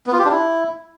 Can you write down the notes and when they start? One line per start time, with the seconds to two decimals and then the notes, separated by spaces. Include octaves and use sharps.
0.07 B3
0.13 F4
0.19 G4
0.25 D4
0.31 E4